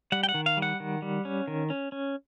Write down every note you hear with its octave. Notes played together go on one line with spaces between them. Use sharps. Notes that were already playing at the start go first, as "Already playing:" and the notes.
G3 F#5
G5
F#5
D#3
F5
G3
F#5
D#3
G3
C#4
D#3
C#4
C#4